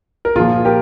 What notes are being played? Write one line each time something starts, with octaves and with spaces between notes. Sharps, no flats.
A#4
A#2 F3 F4 G#4
G4 A#4